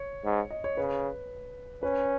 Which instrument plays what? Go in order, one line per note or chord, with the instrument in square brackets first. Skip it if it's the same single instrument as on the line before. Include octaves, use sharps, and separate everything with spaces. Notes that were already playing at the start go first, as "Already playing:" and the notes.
Already playing: [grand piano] C#5
[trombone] G#2
[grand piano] D#5
C#5
[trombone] C#3 [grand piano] B4
[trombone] C#4 [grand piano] B4